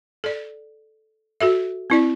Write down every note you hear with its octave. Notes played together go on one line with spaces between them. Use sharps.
A4 D5
F#4 A4 E5
C4 E4 D5